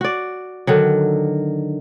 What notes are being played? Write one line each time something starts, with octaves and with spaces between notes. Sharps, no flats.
F#4 D5
D3 D#3 F#3